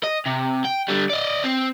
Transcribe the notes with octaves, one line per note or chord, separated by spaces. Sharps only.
D#5
C3
G5
D3 G3
D5 D#5
C4